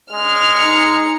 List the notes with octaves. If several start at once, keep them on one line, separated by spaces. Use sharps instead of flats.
G#3 F6
D#4 C#7